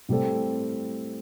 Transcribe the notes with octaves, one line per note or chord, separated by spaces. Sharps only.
A2 G3 C4 A4